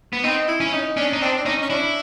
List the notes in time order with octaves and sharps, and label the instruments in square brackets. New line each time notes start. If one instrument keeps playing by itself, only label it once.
[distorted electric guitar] B3
[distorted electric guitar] C4 [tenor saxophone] D#4
[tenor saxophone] E4
[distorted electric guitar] C#4
[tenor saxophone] D#4
[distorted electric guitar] C#4 [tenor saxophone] D4
[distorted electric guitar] D#4
[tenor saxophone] C4 [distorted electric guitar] D4
[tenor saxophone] D4
[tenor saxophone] C#4 [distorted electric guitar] D#4
[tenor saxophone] C#4
[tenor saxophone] D4 [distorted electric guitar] E4